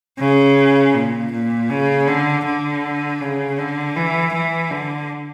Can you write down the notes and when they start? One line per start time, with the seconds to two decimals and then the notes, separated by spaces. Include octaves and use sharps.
0.20 C#3
0.95 A#2
1.32 A#2
1.70 C#3
2.08 D3
2.45 D3
3.21 C#3
3.58 D3
3.96 E3
4.34 E3
4.71 D3